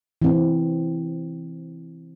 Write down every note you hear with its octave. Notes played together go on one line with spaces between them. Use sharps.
E3 C4